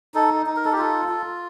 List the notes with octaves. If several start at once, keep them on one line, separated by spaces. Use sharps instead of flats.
D#4 A4
D#4
A#4
A4
G4
F4 A4
F4